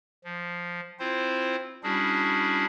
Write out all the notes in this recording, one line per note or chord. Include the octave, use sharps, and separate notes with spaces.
F3
C4 E4 F4 C5
G3 C#4 D4 E4 F#4 G#4